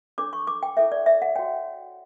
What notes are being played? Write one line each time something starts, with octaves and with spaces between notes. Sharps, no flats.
D4 A4 C#5 D6
C#6
D6
G5
E4 A4 C#5 E5
D5
E5
F#5
F#4 C#5 G5